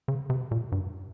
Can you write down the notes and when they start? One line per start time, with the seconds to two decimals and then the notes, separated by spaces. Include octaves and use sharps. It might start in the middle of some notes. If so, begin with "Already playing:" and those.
0.08 C#3
0.30 C3
0.51 A#2
0.72 G2